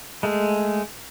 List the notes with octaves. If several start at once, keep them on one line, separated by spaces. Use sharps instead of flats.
G#3 A3